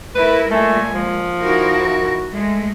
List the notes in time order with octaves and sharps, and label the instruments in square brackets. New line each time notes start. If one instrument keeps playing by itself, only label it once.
[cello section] A3 E4 A#4 [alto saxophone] B4
[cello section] A#2 G#3 [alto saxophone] A3 [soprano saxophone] G#5
[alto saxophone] F3
[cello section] D#4 E4 A#4 [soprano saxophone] F#4
[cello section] G#3 A3